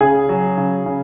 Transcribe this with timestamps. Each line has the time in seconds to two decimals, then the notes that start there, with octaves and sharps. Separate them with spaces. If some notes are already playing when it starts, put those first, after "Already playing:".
0.01 C#3 G#4
0.29 F#3
0.58 C#3
0.86 C#3